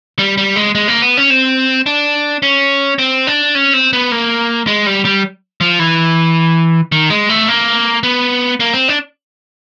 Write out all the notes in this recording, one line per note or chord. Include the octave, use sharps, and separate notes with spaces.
G3
G3
G#3
G#3
A#3
B3
C#4
C4
D4
C#4
C4
D4
C#4
C4
B3
A#3
G#3
G3
G3
F3
E3
D#3
G#3
A3
A#3
B3
A#3
C4
D4